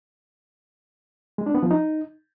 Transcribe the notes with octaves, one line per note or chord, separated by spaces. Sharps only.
G#3
D4
B3
F3
D#4